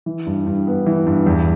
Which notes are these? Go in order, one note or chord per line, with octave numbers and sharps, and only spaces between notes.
E3
G2
G2
B3
E3
G2
E2